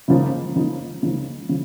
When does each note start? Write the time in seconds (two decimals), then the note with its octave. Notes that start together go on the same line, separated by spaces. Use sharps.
0.08 C#2 C#3 F3 A#3 D#4
0.55 C#2 C#3 F3 A#3 D#4
1.03 C#2 C#3 F3 A#3 D#4
1.49 C#3 F3